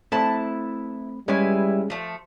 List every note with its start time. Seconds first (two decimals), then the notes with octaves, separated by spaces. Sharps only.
0.12 A3 C4 E4 A5 B5
1.28 G3 G#3 C#4 E4 G#4 B4 G#5
1.90 F3 A3